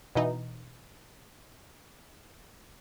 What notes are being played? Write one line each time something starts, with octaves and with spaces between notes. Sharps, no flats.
B2 E3 D#4